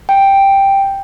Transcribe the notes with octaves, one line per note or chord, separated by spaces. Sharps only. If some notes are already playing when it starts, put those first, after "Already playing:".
G5